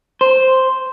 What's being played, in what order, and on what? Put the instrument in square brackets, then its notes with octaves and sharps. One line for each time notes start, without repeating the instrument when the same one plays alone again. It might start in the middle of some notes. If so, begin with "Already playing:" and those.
[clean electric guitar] C5